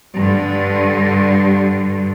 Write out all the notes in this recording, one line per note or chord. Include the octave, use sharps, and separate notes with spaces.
G2 D3